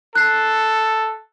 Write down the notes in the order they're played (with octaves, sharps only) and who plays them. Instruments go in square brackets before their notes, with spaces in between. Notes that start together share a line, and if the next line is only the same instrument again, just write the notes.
[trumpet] A4 [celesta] F#6 C7